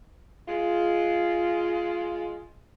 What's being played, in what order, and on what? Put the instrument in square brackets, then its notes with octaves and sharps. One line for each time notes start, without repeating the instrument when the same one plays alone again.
[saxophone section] G#3 F4